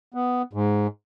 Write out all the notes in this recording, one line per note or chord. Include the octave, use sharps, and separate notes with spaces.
B3
G#2